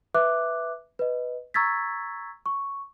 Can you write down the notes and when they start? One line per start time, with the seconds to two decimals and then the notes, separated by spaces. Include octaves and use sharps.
0.14 B4 E5 D6 F#6
0.99 B4 D#5
1.54 A#5 C#6 E6 G#6 A6 B6
2.46 C#6